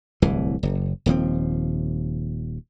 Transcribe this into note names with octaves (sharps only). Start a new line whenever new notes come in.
D1 C2 E3
F#1
D#1 D#2 F3 C4